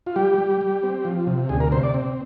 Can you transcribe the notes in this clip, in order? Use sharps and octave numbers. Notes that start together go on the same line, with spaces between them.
F4
G3 G4
G3
G3
C4
F3
C3
D2 G#4
A#4
C3 C5
D5
C4